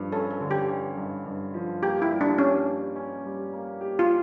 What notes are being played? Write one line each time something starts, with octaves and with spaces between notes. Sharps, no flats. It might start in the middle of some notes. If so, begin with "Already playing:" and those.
Already playing: G2 F3
C#4 A4
A4
D3
G4
C#4
G2
G2
F3
A#3 G4
E4
G3
D4
C#4 G4
G4
C#4
G3
A#3
G4
F4